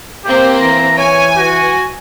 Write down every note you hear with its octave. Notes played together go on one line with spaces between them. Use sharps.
A#3 C4 G4 C5
E3 A#5
C#5 G#5
F#4